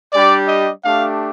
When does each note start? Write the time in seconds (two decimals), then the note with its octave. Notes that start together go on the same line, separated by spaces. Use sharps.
0.13 G3 D4 G4 D5
0.47 D#5
0.83 A3 D4 G4 F5